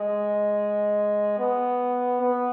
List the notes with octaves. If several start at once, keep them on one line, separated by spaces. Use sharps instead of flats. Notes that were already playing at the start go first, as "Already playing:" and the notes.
Already playing: G#3
B3
B3